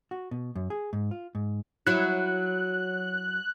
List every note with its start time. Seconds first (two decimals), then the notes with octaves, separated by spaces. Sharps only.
0.11 F#4
0.31 B2
0.55 F#2
0.70 G#4
0.93 G#2
1.11 F4
1.35 G#2
1.87 F#3 E4 F#6